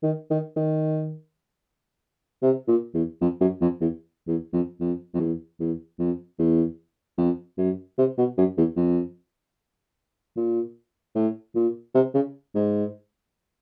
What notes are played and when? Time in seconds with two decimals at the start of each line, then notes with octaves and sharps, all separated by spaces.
0.03 D#3
0.30 D#3
0.56 D#3
2.42 C3
2.68 A#2
2.94 E2
3.21 F2
3.40 F#2
3.61 F2
3.81 E2
4.27 E2
4.53 F2
4.80 F2
5.14 F2
5.20 E2
5.60 E2
5.99 F2
6.39 E2
7.18 F2
7.58 F#2
7.98 C3
8.18 B2
8.38 F#2
8.57 E2
8.77 F2
10.37 A#2
11.15 A2
11.55 A#2
11.94 C3
12.14 C#3
12.55 G#2